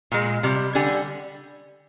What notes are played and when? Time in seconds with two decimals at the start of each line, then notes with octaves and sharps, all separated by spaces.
0.12 A#2 G#3
0.43 C3 G3
0.75 D3 G3 G#5